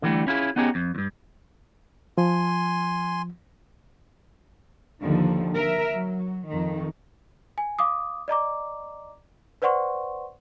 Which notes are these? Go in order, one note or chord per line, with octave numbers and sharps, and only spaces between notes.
D3 E3 F#3 G3 A3
C#4 E4 F4 G#4
B3 C#4 D#4 G4 G#4
F2
E2 G2
F3 G#5 C6
D#2 D3 D#3 F3
A#4 E5
F#3
F2 D#3
G#5
F5 D6 D#6
D5 D#5 A#5 D6
B4 C5 D5 F#5 C6 C#6